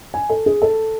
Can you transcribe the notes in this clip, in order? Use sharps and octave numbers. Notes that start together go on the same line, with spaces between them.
G#5
A4
G#4
A4